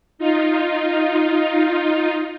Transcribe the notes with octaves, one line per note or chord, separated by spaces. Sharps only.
D#4 F4